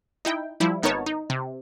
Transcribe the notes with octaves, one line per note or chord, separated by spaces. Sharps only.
D#4 E4 G5
F3 G3 E4
G#1 B3 D#4 A#4 C#5 A5
D#4
C3